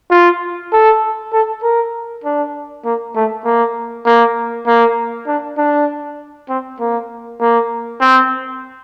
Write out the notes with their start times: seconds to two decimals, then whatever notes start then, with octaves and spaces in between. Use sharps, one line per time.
0.11 F4
0.72 A4
1.33 A4
1.63 A#4
2.24 D4
2.85 A#3
3.15 A3
3.45 A#3
4.06 A#3
4.67 A#3
5.27 D4
5.58 D4
6.49 C4
6.80 A#3
7.41 A#3
8.01 C4